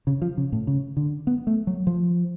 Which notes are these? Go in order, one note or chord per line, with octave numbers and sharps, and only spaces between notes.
C#3
F3
C#3
A2
C#3
D3
B3
A3
F#3
F3